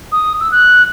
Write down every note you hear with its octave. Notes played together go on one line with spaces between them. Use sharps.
D#6
E6
F#6